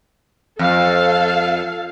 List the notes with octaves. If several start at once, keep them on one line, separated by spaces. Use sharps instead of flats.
F2 A4 F5